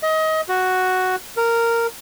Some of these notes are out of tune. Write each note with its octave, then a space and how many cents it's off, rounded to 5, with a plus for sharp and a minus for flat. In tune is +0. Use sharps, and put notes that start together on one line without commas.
D#5 +25
F#4 +0
A#4 -10